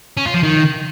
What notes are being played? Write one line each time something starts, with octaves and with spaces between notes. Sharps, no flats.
C#4
F4
F3
D#3